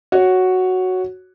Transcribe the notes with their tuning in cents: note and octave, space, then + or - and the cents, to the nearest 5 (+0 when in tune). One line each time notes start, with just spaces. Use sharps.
F#4 +0 C#5 +0